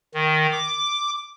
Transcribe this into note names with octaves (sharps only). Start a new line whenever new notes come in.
D#3
D6